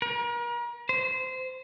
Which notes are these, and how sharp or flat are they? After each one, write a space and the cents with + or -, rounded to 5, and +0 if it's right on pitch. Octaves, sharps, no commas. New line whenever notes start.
A#4 +40
C5 -20